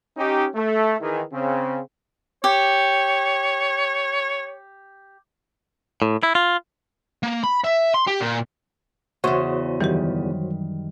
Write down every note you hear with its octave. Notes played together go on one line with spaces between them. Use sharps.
C#4 D#4 G4
A3
D#3 E3 G#4
C#3 C4
G4 C#5
A2
E4
F4
A#3
B5
E5
C6
G4
A#2
E2 C#3 F#4 C5 C#5
F#2 D#3 E3 F#3 G3 G4